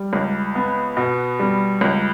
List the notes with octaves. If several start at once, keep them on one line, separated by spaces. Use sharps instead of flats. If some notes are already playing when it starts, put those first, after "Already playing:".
Already playing: G3
C#2
B3
B2
G3
C#2